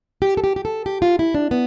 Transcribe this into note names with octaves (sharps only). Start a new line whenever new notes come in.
G4
A4
G4
G4
A4
G4
F4
E4
D4
B3